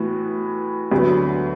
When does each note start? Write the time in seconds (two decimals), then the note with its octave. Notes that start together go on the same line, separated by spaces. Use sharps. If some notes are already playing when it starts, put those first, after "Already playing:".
Already playing: A2 E3 B3 F#4
0.92 D2 D3 F#3 B3